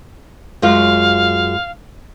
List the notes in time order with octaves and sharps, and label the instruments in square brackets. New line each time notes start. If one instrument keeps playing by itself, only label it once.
[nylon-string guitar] F#2 G#3 F4 [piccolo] F5